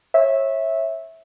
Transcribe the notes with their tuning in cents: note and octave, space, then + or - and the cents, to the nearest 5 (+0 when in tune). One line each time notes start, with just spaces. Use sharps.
C#5 -30 E5 -10